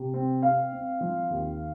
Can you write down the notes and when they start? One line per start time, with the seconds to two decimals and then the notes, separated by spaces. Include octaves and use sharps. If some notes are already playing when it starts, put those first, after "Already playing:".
Already playing: C3
0.14 C4
0.43 C4 F5
0.72 C4
1.01 F3
1.30 D#2